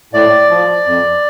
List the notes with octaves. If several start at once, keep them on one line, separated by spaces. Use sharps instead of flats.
A2 D5
F3
F2